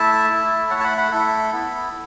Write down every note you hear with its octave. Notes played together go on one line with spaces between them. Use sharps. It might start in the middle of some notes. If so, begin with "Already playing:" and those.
Already playing: A3 E4 E5 A5
A3 E4
A3 E4 C#5 F#5
A5
F#5 B5
F#5 B5
A3 E4 A4
B3 E4